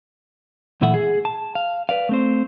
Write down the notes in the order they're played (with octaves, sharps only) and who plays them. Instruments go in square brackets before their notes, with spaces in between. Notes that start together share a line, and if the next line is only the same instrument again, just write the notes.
[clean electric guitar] B1 A#2 E3 A3 E5 F#5
G#4
A5
F5
B4 D5 F5
A3 C4 C5